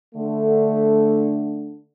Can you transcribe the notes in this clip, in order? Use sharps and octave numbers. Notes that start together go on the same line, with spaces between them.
D3 A3